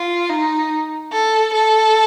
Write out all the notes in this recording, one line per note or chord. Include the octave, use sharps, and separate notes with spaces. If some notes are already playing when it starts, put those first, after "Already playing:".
Already playing: F4
D#4
A4
A4